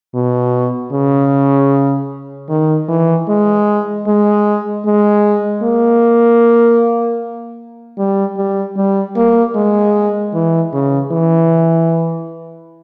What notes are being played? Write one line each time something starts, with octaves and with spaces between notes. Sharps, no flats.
B2
C#3
D#3
E3
G#3
G#3
G#3
A#3
G3
G3
G3
A#3
G#3
E3
C#3
E3